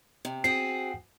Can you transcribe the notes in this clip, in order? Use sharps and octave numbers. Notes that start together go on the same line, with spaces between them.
C3
C4 F#4 G#4 C7